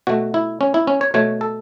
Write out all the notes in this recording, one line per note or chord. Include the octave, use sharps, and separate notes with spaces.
B2 A3 F#4
E4
C#4
E4
C#4
C#5
B2 A3 C#5
A4